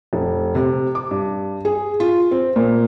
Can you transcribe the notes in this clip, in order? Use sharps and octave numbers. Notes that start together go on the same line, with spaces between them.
F1
C3
D6
G2
G#4
F4
C4
A#2